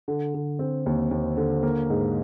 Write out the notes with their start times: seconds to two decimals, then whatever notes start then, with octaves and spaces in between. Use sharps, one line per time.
0.08 D3
0.34 D3
0.59 C4
0.86 D#2
1.11 D#2
1.37 D3
1.63 A#3
1.90 G#2